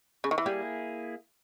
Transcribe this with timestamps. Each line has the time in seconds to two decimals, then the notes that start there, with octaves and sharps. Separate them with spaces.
0.24 C#3
0.31 D#3
0.38 E3
0.46 G3 A#3 E4 G#4